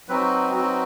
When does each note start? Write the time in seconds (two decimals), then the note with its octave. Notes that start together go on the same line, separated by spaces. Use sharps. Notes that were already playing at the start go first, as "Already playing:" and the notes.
0.08 F#3 C4 D#4 F#4 B4
0.53 F#3 C4 D#4 F#4